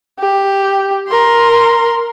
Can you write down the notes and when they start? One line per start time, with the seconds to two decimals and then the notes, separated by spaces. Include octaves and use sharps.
0.19 G4
1.08 A#4 C6